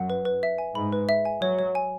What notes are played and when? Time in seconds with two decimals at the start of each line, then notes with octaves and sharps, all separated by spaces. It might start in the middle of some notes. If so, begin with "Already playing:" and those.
Already playing: F#2 F#5
0.10 B4
0.25 B4
0.43 E5
0.58 G#5
0.75 G#2 B5
0.92 B4
1.09 E5
1.25 G#5
1.42 F#3 C#5
1.59 C#5
1.75 G#5